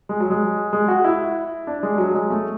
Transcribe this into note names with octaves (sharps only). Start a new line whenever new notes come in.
G#3
F#3
G#3
G#3
F#4
E4
D4
G#3
F#3
G#3
A3